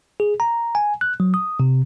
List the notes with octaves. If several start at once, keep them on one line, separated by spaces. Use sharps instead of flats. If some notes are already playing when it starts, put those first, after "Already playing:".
G#4
A#5
G#5
F#6
F#3
D#6
C3